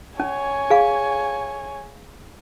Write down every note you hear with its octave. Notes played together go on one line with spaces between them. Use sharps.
C#4 C#5 G#5
G#4 F5